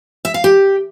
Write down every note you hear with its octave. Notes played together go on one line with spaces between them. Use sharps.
E5
F5
G4